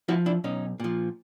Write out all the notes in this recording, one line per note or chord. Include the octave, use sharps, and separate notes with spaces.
F3 E4 F#4
D4 E4
B1 C#4 D#4
A#2 F3